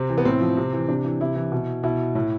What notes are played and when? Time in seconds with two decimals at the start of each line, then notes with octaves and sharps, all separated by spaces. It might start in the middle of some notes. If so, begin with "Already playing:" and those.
Already playing: C3 C4
0.10 E3
0.18 B3
0.25 A2 C4
0.41 F3
0.57 C3
0.73 E3
0.88 C3 D4
1.05 E3
1.21 C3 E4
1.36 E3
1.52 B2
1.83 B2 E4
2.15 A2